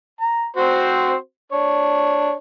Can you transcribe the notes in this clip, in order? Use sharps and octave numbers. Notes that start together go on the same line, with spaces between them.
A#5
C4 F#4 C5
D4 C#5